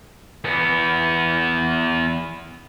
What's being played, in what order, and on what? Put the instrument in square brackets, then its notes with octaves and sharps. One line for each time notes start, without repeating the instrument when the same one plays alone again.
[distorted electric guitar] E2 B3